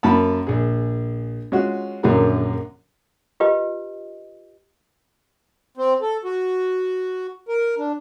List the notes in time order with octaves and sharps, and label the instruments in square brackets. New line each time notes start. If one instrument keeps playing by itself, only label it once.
[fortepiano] F#2 A#3 A5 B5
A#1 G#4
G#3 C#4 F4 F#4
A#1 F#2 D3 F#3 G#4 A#4
[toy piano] F4 G4 B4 D#5
[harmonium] C4
A4
F#4
A#4
D4